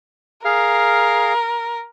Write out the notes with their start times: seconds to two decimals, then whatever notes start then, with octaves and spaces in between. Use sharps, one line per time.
0.45 G#4 A#4 F5 F6